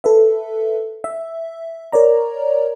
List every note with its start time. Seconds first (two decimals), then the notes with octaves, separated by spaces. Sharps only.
0.04 A4 B4 E5
1.04 E5
1.92 A#4 C#5 D5 A#5